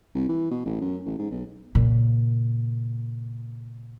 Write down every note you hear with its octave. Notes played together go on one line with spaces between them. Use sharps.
C2
E3
B2
A1
F#2
A1
G#2
B1
A#2 C#3